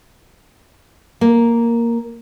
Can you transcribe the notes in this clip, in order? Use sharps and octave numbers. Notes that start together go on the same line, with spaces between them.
A#3